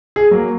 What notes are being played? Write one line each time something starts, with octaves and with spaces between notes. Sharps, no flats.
G#4
F#3 A#3